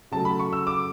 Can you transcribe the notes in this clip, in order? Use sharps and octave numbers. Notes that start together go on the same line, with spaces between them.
C#3 F#3 A3 A5
B5
C#6
E6
D6